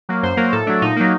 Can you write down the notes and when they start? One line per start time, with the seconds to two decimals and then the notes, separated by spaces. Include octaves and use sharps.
0.09 F#3 A#3
0.23 F#2 C5
0.37 F#3 A#3 A#4
0.52 A2 A4
0.67 F#3 A3 D4
0.82 A#2 D#4
0.96 F#3 A#3